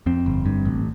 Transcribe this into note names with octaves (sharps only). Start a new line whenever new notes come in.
F2 C4
G1
G2
A1